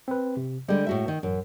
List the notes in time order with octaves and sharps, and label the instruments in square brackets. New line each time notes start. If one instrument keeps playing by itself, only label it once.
[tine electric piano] C4 B4
C3
[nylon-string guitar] D3 G3 [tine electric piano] G#3
[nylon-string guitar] A2 F#4 E5
D#3
[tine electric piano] A1 [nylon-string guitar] F#2